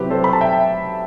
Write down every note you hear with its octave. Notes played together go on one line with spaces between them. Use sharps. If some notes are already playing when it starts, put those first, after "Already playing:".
Already playing: C3 F#3 C4 E4 G4 B4
A4 C5
B5
A5
E5 G5